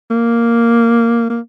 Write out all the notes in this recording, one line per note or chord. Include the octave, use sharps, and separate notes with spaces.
A#3
A#3